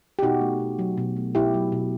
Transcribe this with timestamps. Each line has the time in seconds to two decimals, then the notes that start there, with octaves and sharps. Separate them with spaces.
0.19 G4
0.22 B2 D#4 F#4
0.41 A3
0.60 B2
0.79 F#3
0.98 B2
1.16 A3
1.35 B2 E4 G4
1.54 F#3
1.72 B2